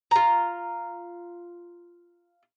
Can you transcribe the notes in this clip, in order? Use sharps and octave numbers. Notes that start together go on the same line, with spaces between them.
F4 A#5